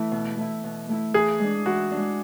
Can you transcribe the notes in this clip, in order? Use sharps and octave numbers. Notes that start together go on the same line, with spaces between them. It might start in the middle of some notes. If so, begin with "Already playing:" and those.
Already playing: E3 A3 E4
B2
A3 E4
B2
A3 E4
E3 G#4
G#3 D4
E3 F#4
G#3 D4